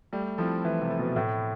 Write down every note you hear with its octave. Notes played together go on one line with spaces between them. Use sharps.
G3 A3
F3 C4 E4 A4
E3 A3
C3
C4 E4 A4
B2
A2 A3